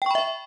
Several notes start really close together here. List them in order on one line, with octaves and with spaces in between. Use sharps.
G5 C#6 B5 E5